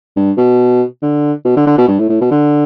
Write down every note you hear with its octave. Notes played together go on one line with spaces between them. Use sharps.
G2
B2
D3
B2
D3
D3
B2
G2
A2
A2
B2
D3